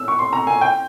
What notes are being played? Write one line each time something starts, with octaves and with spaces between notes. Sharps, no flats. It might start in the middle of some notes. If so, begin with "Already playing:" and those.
Already playing: E6
C#6
C6
A#5
G#5
G5